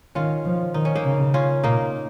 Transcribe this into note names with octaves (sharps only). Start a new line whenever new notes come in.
D#3 C#4 F4
F3
D#3 D#4
C#4
A#3 D#4
C#3
C#4 F4
A#2 A#3 D#4